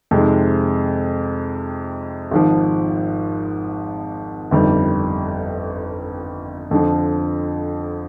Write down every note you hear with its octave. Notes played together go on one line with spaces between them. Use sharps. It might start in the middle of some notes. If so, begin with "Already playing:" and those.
F2 C3 D#3 G#3
G#1 G#2 F3
G1 F2 D#3 G3
F2 D3 F3